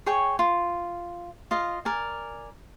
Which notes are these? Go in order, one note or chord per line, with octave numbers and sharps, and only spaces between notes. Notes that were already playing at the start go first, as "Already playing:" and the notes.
G#4 C#5 G5 C#6
F4
F4 D#5 F5
A#4 D5 G#5